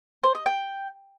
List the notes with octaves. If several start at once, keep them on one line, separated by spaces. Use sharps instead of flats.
C5
D#5
G5